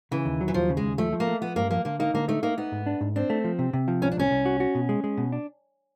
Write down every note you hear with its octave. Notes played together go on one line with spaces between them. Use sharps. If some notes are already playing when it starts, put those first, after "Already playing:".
C#3 E3
D#2
F#3
E3
D#2 F3
C#3
G#3
D#2
F3 A3
F3
A#3
A3
F3 B3
G2 A#3
F3 A#3
D3 A#3
A#3 D#4
D3 A#3
A3 D#4
A#3 D#4
B3 D#4
G#2
D4
G#2
C4 D4
A3
F3
C3
C3
F3
C2 C#4
D4
C2 C#4
C2
F#4
F#4
B2
G#3
G#3
B2
D4